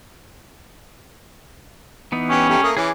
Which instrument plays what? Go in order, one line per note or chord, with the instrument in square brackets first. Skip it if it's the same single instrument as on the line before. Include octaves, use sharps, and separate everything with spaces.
[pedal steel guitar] E3 B3 D#4
[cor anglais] C#4 [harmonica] G4 B4
[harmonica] G3 A3 G4
A3 A#3 D#6
[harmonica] E3 C#4 [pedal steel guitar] G#4 D6